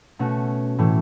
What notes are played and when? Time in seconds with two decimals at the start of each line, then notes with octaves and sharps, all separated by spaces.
0.19 B2 A3 C#4 F#4
0.78 A2 E3 A3